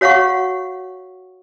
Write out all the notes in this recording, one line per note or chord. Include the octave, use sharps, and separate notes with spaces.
F#4 C#5 F5 F#5 C#6